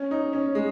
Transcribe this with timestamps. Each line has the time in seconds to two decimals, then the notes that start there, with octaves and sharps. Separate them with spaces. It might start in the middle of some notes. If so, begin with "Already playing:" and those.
Already playing: C#4
0.11 D#4
0.33 C#4
0.55 G#3